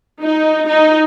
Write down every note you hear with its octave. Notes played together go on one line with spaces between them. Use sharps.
D#4
D#4